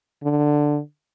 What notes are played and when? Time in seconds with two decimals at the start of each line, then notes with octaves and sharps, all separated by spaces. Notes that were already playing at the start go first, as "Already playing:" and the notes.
0.23 D3